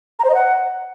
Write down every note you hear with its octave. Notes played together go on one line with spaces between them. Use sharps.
A#5
C5
D#5
F#5